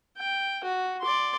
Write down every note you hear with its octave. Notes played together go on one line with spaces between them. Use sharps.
G5
F#4
D5 C6